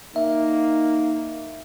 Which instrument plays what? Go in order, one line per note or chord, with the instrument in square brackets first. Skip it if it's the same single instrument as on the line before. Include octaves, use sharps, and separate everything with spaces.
[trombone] A#3 [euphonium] D#4 [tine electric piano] E5